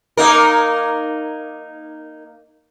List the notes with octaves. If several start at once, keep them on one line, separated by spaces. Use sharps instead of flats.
A#3 D#4 A#4